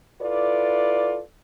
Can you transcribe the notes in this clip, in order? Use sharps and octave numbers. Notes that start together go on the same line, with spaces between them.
E4 F4 A4 B4 D5